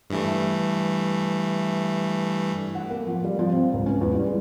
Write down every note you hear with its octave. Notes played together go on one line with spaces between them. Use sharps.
G2 E3 A3
F#5
A#3
F3
G3
F3
C4
C#2
C#4
E2
G3
G#3